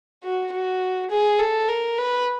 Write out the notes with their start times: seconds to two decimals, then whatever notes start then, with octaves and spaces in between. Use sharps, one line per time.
0.23 F#4
0.52 F#4
1.10 G#4
1.39 A4
1.68 A#4
1.98 B4